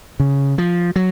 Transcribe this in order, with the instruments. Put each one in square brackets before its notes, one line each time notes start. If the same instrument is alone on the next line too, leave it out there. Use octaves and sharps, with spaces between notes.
[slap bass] C#3
F3
F#3